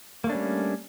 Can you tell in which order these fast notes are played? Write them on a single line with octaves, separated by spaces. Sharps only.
A#3 A3 D4 C#4 G3